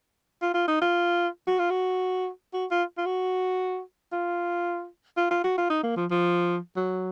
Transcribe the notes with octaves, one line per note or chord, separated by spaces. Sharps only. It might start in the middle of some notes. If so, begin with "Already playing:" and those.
F4
F4
D#4
F4
F#4
F4
F#4
F#4
F4
F4
F#4
F4
F4
F4
F#4
F4
D#4
A#3
F3
F3
F#3